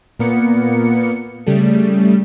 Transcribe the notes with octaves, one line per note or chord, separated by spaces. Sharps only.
A#2 A#3 B3 C#7
C#3 G3 A3